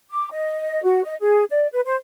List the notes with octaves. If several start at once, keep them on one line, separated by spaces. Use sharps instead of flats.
D6
D#5
F#4
D#5
G#4
D5
B4
C5